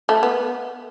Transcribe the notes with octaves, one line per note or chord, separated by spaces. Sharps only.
A3
B3